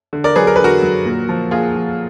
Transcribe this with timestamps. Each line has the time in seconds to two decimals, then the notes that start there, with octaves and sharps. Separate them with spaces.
0.13 D3
0.24 A#4 D5
0.36 F#3 G#4 B4
0.47 A#4
0.56 D3 B4
0.64 F#4 A#4
0.82 F#3
1.06 A#2
1.29 F3
1.51 A#2 F4 G#4
1.75 F3